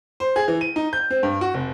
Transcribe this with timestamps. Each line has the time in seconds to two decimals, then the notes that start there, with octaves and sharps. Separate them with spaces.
0.20 C5
0.36 G#4
0.48 E3
0.61 D#7
0.76 D#4
0.93 G6
1.10 C4
1.23 G2
1.41 F#4
1.54 F1